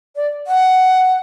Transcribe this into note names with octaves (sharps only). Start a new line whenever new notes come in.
D5
F#5